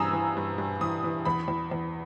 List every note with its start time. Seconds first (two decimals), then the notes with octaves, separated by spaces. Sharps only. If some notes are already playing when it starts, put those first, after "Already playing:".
Already playing: G2 E3 G#5 A#5 D#6 E6
0.13 E3
0.37 G2
0.58 G2
0.81 E3 D#6
1.04 E3
1.25 E2 B5
1.48 E2
1.71 E2